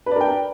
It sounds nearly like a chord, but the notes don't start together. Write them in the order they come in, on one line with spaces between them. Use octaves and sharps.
B4 D5 A#4 G5